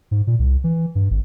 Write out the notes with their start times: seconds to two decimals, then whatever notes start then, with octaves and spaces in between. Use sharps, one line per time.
0.11 G#2
0.27 A#2
0.39 C2
0.64 E3
0.95 G2
1.11 G#1